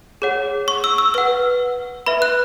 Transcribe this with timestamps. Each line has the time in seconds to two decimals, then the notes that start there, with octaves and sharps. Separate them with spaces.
0.22 G#4 C#5 F#5
0.68 C#6
0.84 E6
0.98 E6
1.14 B4 F#5 E6
2.06 B4 E5 B5
2.22 F#6